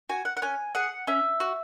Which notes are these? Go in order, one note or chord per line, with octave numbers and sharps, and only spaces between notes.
F#4 G#5
F#5
F#5
C#4 G#5
G#4 F#5
C#4 E5
F#4